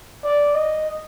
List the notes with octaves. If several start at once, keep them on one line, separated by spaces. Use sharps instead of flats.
D5
D#5